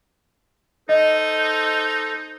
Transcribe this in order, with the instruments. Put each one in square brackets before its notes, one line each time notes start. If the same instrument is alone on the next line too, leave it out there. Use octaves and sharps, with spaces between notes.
[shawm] D#4 [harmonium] A4 C5 [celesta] D#5